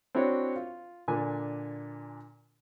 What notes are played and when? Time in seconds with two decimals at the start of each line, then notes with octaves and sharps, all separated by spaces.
0.15 C4 D4 E4 F#4 C#5
0.56 F4
1.08 A#2 D3 D4 G#5